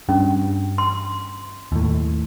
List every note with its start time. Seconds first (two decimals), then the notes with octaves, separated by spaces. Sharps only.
0.09 G2 C#4
0.78 C6
1.72 D#2 A2